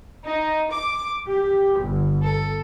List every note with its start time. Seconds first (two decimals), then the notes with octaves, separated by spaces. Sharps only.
0.24 D#4
0.70 D6
1.27 G4
1.78 G1
2.23 A4